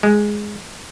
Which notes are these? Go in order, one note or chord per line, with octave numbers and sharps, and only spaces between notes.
G#3